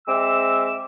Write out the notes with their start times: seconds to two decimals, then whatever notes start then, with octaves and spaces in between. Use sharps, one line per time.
0.07 G#3 C4 E5 D6 E6